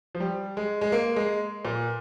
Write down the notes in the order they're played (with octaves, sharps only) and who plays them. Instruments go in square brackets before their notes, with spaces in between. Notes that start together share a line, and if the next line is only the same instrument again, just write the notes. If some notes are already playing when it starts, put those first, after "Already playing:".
[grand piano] F3
G3
G#3
G#3
A#3
G#3
A#2